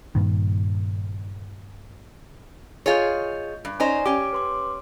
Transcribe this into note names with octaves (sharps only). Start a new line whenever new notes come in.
G2 A#2 D#3
F4 G#4 C#5 D#5 G6
G2
C#4 D#4 C5 D5 G#5
C#4 G4 D6
B4 C6 D6